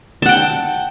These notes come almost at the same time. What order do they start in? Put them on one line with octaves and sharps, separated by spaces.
A5 F#5 G5